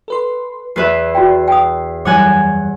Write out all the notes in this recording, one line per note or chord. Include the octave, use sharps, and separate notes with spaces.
A4 B4 C6
E2 B4 E5 C7
F#4 D5 G5
G5 D#6
F#2 E3 G3 C#5 F#5 G#5 D6